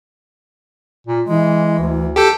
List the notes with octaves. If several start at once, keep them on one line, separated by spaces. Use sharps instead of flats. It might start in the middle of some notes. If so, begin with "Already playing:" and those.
A#2
E3 G#3
D2
G4 A4 G5